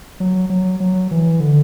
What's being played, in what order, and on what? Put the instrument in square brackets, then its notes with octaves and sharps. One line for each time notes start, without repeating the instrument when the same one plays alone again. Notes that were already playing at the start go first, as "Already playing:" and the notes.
[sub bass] F#3
F#3
F#3
E3
D3